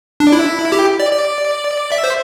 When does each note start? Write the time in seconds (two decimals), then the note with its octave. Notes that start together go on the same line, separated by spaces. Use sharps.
0.20 D4
0.32 E4
0.72 G4
1.00 D5
1.12 D5
1.92 E5
2.04 C5